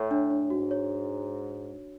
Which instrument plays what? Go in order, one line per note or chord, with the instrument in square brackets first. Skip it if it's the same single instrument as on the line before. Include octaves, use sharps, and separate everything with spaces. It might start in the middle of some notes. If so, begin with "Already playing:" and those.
Already playing: [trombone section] A2 [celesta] C#5
[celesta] D4
D4
[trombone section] G#2 [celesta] F#4
[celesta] C#5